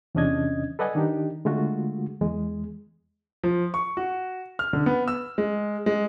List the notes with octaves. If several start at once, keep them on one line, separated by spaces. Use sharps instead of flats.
E2 C3 C#4 D4 D#5 G#6
A4 B4 D5 D#5 F#5 G#5
D#3 D4 D#4 G4
D3 G#3 A3 F4 F#4
E2 G#3
F3
C#6
F#4
F6
D3
B3
E6
G#3
G#3